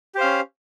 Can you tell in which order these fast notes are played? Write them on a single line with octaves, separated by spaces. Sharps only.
G4 C5 F5 C#4